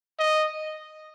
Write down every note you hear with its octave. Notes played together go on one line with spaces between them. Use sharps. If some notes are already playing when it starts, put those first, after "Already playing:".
D#5